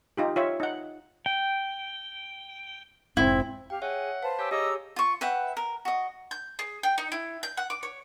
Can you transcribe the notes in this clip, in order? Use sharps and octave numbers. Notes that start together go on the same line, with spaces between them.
D#4 F4 G4
F4 C#5 E5
D#4 F#5
G5
F1 G#2 C4 E4
G4 F5 G5
G#4 C#5 E5 F#5
B4 C5 F5 A5
G4 C#5 G#5 E6
G4 G#4 C#5 D#5 A#5 D6 E6
F4 C#6
B4 E5 F#5 G5
A#4
F#4 D#5
G6
G#4
G5
D#4
E4
G6
F#5
D6
C#5